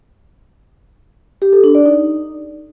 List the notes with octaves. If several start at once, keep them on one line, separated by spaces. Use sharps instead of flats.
G4
A4
D4
D5
D#4